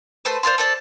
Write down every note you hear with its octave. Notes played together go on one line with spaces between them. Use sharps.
A3 B4 C5
C5 D5 F5 C6
A4 C5 D5